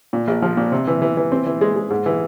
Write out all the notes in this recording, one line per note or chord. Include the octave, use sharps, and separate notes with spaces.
A#2
A#1
F3
A#2
C3
E3
E3
E3
C4
E3
G#3
G#3
G#2
E3